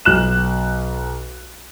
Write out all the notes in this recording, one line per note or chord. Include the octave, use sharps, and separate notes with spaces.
B1 F#6 E7